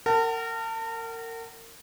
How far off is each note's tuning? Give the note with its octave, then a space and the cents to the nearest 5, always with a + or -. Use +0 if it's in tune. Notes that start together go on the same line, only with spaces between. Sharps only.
A#4 -30 F#5 +30 A5 +35